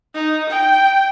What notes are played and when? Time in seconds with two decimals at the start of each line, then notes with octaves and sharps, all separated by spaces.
0.15 D#4
0.49 G5